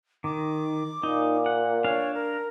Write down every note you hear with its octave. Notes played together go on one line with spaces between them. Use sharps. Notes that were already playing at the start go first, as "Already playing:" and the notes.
D#3 D6
A#2 D#4
F#5
D4 C#5 F5
A#4